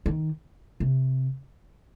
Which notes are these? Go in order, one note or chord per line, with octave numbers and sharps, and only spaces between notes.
D#3
C3